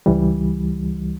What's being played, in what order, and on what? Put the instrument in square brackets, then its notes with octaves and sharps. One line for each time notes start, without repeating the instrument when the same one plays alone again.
[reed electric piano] C#2 E3 G3